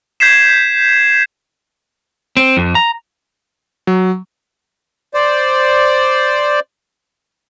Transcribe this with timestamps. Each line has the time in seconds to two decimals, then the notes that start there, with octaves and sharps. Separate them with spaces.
0.20 G6 G#6 B6 C7 E7
2.37 C4
2.57 F2
2.75 A#5
3.87 F#3
5.14 C5 D5